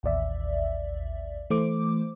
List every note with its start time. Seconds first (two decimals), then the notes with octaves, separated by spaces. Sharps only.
0.03 A1 D#2 D5 E5
1.50 E3 A3 C5 D6